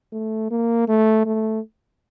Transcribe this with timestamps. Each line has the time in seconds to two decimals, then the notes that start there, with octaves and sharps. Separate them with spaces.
0.13 A3
0.51 A#3
0.89 A3
1.26 A3